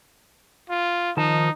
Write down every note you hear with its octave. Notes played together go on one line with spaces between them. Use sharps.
F4
D#3 F3 D#4 A5